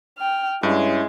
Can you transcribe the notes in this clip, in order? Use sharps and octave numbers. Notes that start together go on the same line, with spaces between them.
G5 F6
G2 G#3 C#4 E4